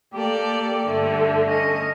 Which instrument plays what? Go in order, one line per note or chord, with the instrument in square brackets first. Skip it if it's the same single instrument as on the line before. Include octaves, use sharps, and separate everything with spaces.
[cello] A#3 [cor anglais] G4 [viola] A4 D5
[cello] G2 [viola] D3 [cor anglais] A3
[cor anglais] C#4 [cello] D#5